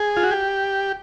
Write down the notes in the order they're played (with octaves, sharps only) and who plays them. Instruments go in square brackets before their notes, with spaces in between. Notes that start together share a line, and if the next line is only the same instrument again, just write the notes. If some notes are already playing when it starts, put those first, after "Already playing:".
Already playing: [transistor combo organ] G#4
F4
F#4
G4